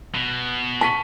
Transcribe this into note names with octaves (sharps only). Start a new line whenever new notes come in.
B2
A5 C#6 B6 D#7